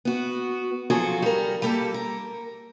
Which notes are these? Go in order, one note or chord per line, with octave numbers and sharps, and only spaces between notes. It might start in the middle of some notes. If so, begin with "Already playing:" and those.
B3 F#4
F3 F#3 F4 F#4 G#4 A4
G3 A#4
G3 A#3 G4 A4
A#4